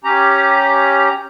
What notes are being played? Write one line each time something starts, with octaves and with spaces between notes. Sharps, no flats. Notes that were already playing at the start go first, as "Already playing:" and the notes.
C#4 G4 A#5